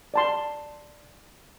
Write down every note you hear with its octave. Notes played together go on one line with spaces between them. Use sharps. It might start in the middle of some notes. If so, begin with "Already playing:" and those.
D5 A5 C6